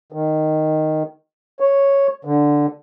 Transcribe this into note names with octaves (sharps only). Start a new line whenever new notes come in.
D#3
C#5
D3